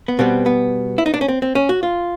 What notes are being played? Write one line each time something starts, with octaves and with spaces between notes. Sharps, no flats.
B3
B2 G3 B3 C4
B3
E4
D#4
D4
C#4
C4
C4
C#4
F#4
F4